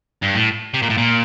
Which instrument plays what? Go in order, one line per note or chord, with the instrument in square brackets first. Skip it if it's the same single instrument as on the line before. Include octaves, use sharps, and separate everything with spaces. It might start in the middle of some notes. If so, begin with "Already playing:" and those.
[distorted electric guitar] G2
A2
C3
A#2
A2
A#2